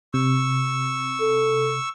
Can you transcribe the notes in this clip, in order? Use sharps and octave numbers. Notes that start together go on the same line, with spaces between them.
C3 C#6 E6
A4